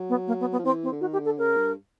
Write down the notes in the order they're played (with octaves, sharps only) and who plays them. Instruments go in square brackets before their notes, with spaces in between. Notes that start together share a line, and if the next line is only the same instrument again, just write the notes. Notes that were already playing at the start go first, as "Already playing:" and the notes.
Already playing: [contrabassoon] F#3
[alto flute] B3
A#3
B3
B3
[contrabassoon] F3
[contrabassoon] E3 [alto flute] C4
[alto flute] C4
[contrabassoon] D3
[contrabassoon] D#3 [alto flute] F#4
[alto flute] G4
[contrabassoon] D3
[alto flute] A4
[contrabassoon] C#3 [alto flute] A#4
[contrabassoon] G2